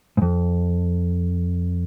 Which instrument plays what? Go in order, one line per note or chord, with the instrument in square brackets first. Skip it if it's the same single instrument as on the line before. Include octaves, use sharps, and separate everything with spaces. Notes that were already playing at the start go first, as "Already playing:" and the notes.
[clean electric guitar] F2 G#2